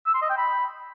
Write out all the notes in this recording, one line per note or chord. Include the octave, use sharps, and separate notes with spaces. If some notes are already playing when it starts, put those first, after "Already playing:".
E6
C6
D#5
G5
B5